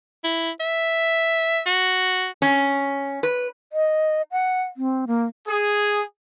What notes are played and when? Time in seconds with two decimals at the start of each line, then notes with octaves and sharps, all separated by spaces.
0.24 E4
0.60 E5
1.66 F#4
2.42 C#4
3.23 B4
3.73 D#5
4.32 F#5
4.77 C4
5.07 A#3
5.47 G#4